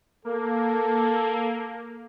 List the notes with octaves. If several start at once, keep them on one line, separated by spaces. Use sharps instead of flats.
A#3 A4